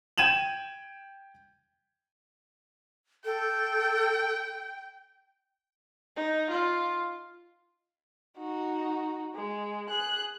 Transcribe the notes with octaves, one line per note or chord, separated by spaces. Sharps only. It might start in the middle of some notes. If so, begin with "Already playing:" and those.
G5 G#6 D#7 E7 F#7
A4 G5
D#4
F4
D#4 F#4
G#3
G#4 F#6